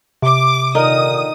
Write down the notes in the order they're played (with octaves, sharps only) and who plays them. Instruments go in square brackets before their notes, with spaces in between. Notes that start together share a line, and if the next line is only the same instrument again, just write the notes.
[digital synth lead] C3 [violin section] D6
[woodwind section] A#2 D3 D#3 [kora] D#4 A#4 [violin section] D#6